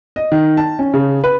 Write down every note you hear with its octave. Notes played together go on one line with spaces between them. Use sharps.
D#5
D#3
A5
C#4
C#3
B4